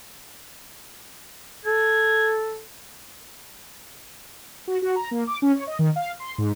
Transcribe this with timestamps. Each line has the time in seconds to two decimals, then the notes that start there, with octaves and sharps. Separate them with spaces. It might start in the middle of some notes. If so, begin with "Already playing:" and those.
1.65 A4 G#6
4.68 F#4
4.82 F#4
4.96 A#5
5.11 A#3
5.27 D6
5.42 C#4
5.55 C#5
5.67 D#5
5.79 D#3
5.96 F5
6.20 C6
6.38 G#2